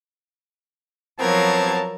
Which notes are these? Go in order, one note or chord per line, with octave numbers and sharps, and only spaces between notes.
F3 F#3 B3 C4 A#4 A5 G#6